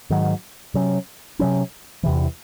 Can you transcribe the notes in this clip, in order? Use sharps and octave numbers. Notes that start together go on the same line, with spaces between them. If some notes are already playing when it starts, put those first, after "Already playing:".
G#2 D#3 F#3
C3 F#3 C#4
C3 F#3 C#4
E2 C3 E3